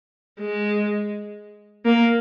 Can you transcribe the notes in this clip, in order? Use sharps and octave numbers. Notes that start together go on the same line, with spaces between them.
G#3
A#3